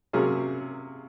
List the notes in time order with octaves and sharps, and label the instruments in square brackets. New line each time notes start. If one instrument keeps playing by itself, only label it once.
[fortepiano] C3 F#3 A#3 C#4 G#4